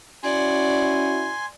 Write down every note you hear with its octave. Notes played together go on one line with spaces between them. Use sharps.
C#4 E4 F#4 D5 F#5 G#5 C6